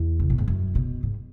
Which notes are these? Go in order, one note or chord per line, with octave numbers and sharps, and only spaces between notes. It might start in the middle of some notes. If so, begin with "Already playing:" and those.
Already playing: E2
C#3
B2
G#2
F#2
B2
G#2